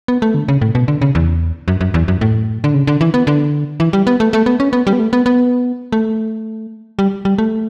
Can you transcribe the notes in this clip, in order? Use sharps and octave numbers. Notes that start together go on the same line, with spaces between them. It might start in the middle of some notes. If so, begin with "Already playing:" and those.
B3
A3
D3
C#3
A2
B2
D3
C#3
E2
F#2
F#2
E2
F#2
A2
D3
C#3
D3
E3
B3
D3
E3
G3
B3
A3
A3
B3
C#4
B3
G3
B3
A3
B3
B3
A3
G3
G3
A3